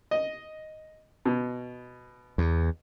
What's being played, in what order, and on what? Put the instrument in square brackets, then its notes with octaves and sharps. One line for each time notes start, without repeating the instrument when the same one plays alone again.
[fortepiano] D#5
B2
[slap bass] E2